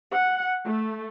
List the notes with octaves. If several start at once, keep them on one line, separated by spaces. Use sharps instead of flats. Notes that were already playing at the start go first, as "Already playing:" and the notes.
F#5
A3